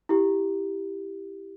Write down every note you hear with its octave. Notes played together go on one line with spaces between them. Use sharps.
E4 G4